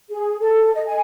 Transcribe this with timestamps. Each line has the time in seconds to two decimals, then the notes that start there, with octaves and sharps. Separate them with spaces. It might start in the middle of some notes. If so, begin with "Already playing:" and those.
0.10 G#4
0.41 A4
0.74 D#5
0.87 G#5